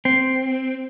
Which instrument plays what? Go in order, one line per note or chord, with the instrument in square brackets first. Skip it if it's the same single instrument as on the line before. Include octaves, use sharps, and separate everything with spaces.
[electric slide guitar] C4